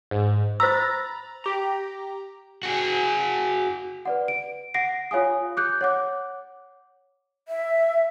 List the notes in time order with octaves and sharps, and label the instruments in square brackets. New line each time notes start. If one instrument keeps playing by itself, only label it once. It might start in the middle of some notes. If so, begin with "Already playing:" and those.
[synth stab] G#2
[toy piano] C5 E6 [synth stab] A#5 B5 A6
[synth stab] G4 A#5
[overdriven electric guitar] F#4 G#4
[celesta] B4 D5 F#5
D7
F#5 A#6 C7 D7
F4 C#5 F5 G#5 D#6
D6 F#6 G6
C#5 F#5 D6
[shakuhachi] E5